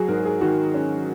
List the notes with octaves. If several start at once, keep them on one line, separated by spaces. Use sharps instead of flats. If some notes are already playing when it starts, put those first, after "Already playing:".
Already playing: F#3 F#4 G#4
G#2 A#4
G#4
D#3 F#4
C#4